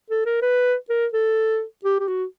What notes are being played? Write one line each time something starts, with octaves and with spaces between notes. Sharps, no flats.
A4
A#4
B4
A#4
A4
G4
G4
F#4